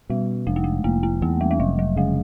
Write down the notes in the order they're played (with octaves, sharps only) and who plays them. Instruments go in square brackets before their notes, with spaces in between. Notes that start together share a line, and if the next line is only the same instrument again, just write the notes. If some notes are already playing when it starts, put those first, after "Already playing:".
[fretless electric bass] B2 [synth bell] G3
[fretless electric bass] F1 [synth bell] G#3
[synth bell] A3
G#3
[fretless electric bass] F1 [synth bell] A#3
[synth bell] A#3
[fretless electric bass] E2 [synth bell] A3
[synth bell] G3
G3
[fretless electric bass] F1 [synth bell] F#3
[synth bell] F#3
[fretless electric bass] C#3 [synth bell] G#3